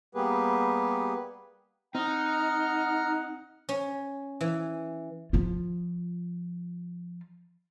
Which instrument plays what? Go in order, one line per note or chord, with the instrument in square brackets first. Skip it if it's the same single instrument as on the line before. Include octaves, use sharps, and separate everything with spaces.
[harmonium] G3 A#3 B3 G4 G#4 B4
[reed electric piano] C4 [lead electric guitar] D#4 [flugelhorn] F#5 [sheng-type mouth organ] A#5 F6
[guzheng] C#4
E3
[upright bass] F3 F4